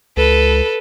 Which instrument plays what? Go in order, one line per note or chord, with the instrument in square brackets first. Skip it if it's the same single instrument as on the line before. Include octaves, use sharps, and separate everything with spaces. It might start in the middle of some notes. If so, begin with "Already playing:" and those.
[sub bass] C#2 [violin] A4 B4